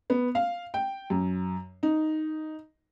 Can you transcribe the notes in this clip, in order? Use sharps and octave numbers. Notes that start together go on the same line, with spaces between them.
B3
F5
G5
F#2
D#4